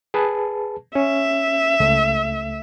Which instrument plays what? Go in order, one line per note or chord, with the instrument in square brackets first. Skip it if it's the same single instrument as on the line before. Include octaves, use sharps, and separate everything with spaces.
[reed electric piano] G#4 B4 A5
[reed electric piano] C#4 [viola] E5
[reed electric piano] C#2 A3